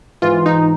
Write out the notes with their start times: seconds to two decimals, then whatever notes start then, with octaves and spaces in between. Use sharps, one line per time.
0.22 G#2 E3 F4
0.46 D#4